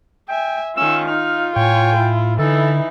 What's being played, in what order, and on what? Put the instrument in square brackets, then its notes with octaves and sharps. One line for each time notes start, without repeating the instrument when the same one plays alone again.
[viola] E5 G#5 [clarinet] G5
[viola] D#3 C#4 [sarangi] F4 [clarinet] E6
[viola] D#4 [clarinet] F6
[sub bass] A2 [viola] C#5 G#5 [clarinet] G5
[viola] E4
[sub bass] D3 [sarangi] E3 [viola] D#4 E4 [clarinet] A4